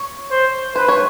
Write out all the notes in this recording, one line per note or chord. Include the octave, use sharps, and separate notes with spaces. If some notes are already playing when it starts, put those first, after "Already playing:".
Already playing: C#5
C5
B4 C5
C#5